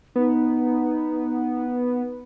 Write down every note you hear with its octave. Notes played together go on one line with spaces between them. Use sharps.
B3 D#4